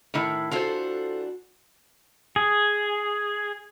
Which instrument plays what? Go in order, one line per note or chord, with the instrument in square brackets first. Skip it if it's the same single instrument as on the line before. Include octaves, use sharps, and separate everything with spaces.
[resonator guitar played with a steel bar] A2 D#3 E4
[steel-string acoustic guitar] E3 D4 F#4 [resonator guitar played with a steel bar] F4 A4 C5
[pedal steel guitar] G#4